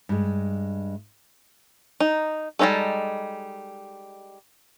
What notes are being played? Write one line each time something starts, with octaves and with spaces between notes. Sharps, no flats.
G2 G#3
D#4
G3 G#3 C#4 D#4 A4